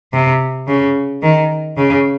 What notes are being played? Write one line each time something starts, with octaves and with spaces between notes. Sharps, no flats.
C3
C#3
D#3
C#3